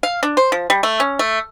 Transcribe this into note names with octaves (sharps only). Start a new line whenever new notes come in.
F5
D4
C5
F3
G3
A3
C#4
A3